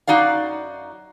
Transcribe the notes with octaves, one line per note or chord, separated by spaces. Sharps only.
F#2 D#4 F#4 D5 F5